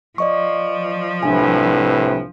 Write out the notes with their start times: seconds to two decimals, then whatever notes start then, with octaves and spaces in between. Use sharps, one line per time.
0.18 F3 D5 D#5 C#6
1.23 C2 A2 C3 D4 B4 G#5